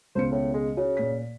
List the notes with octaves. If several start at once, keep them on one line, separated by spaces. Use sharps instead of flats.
C#2 B2 C5 C#7
A2
G#3
C#3 F#4
A#2 B6